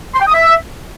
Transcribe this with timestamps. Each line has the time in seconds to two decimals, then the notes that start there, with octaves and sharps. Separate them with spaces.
0.14 C6
0.20 G5
0.27 D#6
0.33 E5